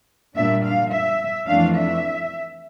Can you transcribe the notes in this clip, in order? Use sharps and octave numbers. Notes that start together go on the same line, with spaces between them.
A#2 G3 D4 E5
F5
E5
F2 E3 A3 D4 F5
E5